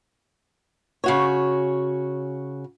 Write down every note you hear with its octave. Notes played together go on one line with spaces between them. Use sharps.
C#3 F#4 C#5